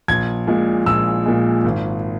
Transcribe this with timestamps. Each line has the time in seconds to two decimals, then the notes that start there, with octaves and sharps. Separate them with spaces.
0.08 A#1 G#6
0.47 A#2 G#3
0.86 A#1 E6
1.26 A#2 G#3
1.64 G#1